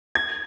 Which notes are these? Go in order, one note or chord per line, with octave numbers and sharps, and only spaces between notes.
G#6